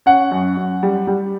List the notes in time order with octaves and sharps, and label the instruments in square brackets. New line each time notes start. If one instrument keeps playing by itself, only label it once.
[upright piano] C#4 F#5
F#2
F#2
G3
G3